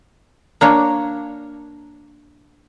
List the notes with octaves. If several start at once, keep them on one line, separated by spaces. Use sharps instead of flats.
A#3 D4 C#5